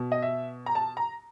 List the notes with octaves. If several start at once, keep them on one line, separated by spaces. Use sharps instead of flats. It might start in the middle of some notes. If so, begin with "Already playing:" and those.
Already playing: B2
D#5
E5
A#5
A5
A#5